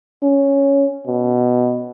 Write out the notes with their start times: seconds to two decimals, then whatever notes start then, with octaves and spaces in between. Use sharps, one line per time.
0.23 C#4
1.07 B2